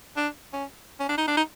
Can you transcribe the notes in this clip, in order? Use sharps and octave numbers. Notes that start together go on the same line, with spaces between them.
D4
C#4
C#4
D4
D#4
D4
D#4